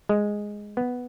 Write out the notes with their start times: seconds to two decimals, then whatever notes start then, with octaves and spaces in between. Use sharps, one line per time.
0.09 G#3
0.77 B3